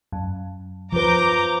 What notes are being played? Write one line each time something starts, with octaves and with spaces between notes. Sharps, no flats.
F#2
F3 B4 A#5 D6 G6